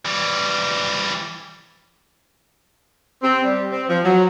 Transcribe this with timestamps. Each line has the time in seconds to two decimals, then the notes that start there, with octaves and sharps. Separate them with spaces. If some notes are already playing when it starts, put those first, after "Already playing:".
0.05 E3 G3
3.23 C4
3.43 G3
3.71 C4
3.90 F3
4.04 F#3